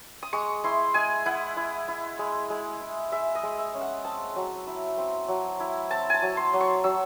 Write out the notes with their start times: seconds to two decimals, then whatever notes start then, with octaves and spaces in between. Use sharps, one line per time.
0.23 D#6
0.33 G#3 C#6
0.64 E4 C6
0.94 G#3 G#5
1.26 E4 F#5
1.57 E4
1.88 E4
2.19 G#3
2.50 G#3
2.81 E4
3.12 G#3 E5
3.35 D#5
3.43 G#3
3.59 E5
3.74 C#4
3.81 F#5
4.05 C4 A5
4.36 F#3
4.67 E4
4.98 C4
5.28 F#3
5.60 E4
5.91 C4 A5
6.10 G#5 A5
6.22 F#3
6.37 C6
6.53 F#3
6.61 C#6
6.84 F#3 E6